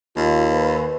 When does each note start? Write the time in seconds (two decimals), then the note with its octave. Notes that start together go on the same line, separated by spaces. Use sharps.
0.16 D#2 F4
0.52 B4